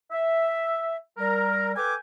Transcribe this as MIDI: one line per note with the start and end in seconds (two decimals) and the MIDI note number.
0.11 0.97 76
1.18 1.71 55
1.18 1.71 70
1.75 1.93 69
1.75 1.93 71
1.75 1.93 79
1.75 1.93 80
1.75 1.93 86